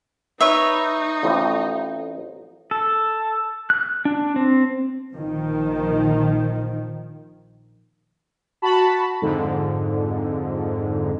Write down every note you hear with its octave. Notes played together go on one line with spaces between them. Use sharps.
D#4 B4 C#5 E5
A1 F2 A2
A4
F#6
D4
C4
A#1 D#3 F3
F#4 A5 B5
F2 G#2 D3